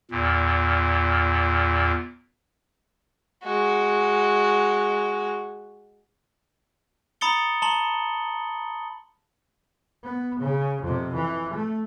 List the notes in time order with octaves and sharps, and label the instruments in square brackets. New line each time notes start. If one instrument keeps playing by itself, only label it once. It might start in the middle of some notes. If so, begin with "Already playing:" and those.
[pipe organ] E2 A#2
[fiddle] G#3 F#4
[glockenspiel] A#5 B5 D#6 A6 C#7 G7
A5 A#5 C6 F#7 G7
[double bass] B3
C#3
F2 C3
E3
A3